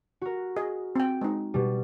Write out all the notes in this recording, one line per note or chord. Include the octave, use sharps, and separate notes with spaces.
F#4 A#4
G#4 D#5
C4 G5
G#3 D#4
B2 G3